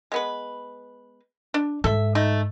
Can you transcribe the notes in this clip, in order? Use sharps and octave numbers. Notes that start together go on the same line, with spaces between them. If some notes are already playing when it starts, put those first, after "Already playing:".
G#3 B3 B4
D4
G#2 A4 E5
A3 D#4